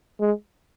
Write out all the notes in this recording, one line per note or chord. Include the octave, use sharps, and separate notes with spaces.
G#3